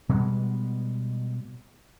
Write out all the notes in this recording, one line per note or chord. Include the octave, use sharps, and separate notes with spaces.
B2 G3 G#3 B3